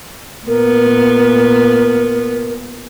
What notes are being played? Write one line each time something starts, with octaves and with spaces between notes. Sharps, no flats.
A#2 B3 A#4